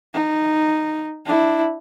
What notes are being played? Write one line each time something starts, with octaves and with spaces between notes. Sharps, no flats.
D#4
D4 E4